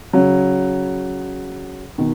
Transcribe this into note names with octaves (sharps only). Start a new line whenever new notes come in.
C#3 F#3
B2 D#3